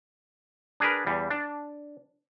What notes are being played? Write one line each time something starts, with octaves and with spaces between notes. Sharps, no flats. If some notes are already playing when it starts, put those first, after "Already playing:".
D4 G#4 A#4 B4
E2 G3
D4